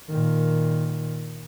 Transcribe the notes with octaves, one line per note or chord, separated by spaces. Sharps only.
A#2 D#3